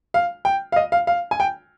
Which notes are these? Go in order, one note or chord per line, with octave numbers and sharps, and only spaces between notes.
F5
G5
F5
D#5
F5
F5
G#5
G5